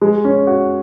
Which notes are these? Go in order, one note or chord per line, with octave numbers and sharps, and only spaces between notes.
G#3
C#4
F#4